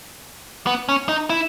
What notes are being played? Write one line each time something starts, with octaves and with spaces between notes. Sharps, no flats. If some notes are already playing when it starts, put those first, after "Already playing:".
B3
C#4
D#4
E4